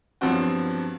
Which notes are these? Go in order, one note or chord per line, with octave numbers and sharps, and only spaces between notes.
G2 F3 F#3 B3 C4 F#4